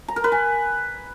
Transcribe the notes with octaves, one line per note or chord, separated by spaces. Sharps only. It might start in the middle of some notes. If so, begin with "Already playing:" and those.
A#5
A#4
B4
G#5